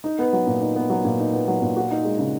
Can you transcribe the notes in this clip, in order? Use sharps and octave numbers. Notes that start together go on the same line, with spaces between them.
D#4
B3
F#3
A#2
D#4
B3
F#3
A#2
D#4
B3
F#3
A#2
F#4
D#4
G#3
C#3